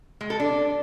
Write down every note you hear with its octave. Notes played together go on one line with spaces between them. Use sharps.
G#3
A4
D4